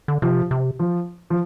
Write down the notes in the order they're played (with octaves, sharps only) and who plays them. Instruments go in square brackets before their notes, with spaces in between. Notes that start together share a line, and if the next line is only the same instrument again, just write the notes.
[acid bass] D3
[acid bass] C3 [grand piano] F3
[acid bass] C3
[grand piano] F3
F3